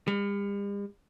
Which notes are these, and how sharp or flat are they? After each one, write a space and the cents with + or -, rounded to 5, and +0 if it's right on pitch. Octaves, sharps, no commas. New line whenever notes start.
G3 +45